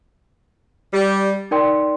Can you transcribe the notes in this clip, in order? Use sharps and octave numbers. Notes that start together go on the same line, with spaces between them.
G3
D#4 A#4 D5 G5 C6